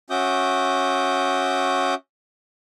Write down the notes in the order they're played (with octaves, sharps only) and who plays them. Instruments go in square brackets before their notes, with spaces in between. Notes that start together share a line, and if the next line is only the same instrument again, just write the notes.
[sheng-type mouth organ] C#4 F#4 E5 D6 D#6 G6